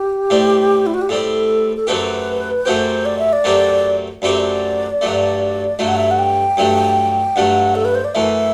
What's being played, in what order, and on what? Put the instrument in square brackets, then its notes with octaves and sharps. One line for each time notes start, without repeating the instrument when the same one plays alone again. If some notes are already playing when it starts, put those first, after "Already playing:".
Already playing: [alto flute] G4
[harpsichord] A2 G3 C4
[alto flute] E4
F#4
G4
[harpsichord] A2 G3 C4 [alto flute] A4
[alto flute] A4
[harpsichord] F#2 F#3 A3 C4 G4 [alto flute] B4
[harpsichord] F#2 F#3 A3 C4 G4 [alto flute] C5
[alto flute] D5
E5
D5
[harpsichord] F#2 F#3 A3 C4 G4
[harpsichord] F#2 F#3 A3 C4 G4 [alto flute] D5
[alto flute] E5
D5
[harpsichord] G2 F#3 A3
[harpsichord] G2 F#3 A3 [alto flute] E5
[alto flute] F#5
E5
F#5
G5
[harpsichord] G2 F#3 A3
[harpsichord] G2 F#3 A3 [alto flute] F#5
[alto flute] A4
B4
C5
D5
[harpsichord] F#2 E3 A3 [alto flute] E5